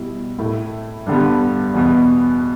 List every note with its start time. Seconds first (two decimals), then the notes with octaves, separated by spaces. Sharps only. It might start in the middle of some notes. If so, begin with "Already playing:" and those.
Already playing: B2 G3 E4
0.38 A2 A3 E4
1.07 G2 D3 G3 B3
1.74 E2 B2 B3